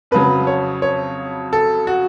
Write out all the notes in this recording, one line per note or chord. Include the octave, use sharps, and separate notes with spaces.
F2 C#3 F#3 B4
C#5
C#5
A4
F#4